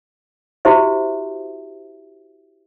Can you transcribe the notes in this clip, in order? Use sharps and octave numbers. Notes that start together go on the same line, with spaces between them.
E4 F#4 G4 C5 E5